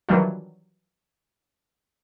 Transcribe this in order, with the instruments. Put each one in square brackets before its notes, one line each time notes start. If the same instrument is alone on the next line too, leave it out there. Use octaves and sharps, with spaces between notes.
[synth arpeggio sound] D#3 E3 F#3 G3 D4 F4